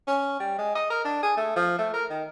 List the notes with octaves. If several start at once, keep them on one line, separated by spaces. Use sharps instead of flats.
C#4
G3
G#3
D#5
A#4
D4
G#4
A3
F3
A3
A#4
D#3